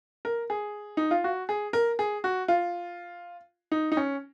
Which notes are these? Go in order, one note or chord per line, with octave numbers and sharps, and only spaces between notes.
A#4
G#4
D#4
F4
F#4
G#4
A#4
G#4
F#4
F4
D#4
D#4
C#4